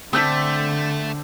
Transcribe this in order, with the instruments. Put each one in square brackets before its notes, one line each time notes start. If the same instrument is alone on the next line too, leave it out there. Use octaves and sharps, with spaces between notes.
[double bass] D3 [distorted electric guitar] A3 [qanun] C4 D4 [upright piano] E6 G6 B6